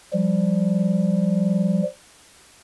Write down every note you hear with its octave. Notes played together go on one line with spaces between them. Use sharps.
F3 G3